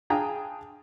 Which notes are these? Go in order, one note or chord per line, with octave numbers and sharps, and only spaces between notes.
D4 F4 G#4 G5 G#5 A#5